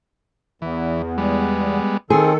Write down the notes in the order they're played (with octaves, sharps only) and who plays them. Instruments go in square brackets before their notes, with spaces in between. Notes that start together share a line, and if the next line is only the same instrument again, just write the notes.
[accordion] E2 [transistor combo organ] E3
[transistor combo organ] G3 G#3 B3
[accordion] D#3 A4 [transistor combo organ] C4 [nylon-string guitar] G#4